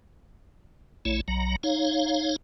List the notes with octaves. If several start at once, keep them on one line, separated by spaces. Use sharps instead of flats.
A#1 A3 E4 C#5
B1 F#3 A#5
D#4 C#5 F5